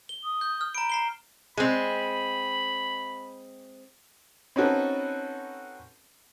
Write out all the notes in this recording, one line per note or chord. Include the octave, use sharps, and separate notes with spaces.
G7
D#6
G6
F6
A#5 B5 D7
A#5 C7 G7
G#3 C4 B5
C4 C#4 D#4 F#4 A4 B4